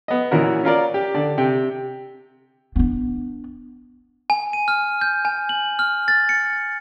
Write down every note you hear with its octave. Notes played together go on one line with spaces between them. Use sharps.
B3 D#5
A#2 E3 C#4 F#4 A#4
C#4 F4 A#4 D5
G4
D3 D5
C3 G5
B3 D4
G#5
D#7
F6
G6
G#5
F#7
F6
A6
C#7